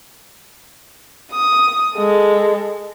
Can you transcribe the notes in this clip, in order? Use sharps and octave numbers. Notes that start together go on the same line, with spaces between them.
D#6
G#3 A4